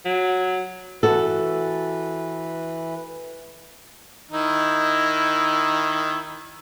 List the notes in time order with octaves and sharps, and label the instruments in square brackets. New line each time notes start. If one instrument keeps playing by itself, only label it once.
[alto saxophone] F#3
[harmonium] E3 B4 [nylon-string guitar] F#4 A4
[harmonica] D#3 D#4 E4